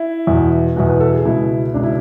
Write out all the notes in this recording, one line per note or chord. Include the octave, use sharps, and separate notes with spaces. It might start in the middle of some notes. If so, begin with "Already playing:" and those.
Already playing: E4
E2 B2
E2 B2 F#4
B4
A4
G#4
C#2 B2 E4
C#2 B2 D4
E4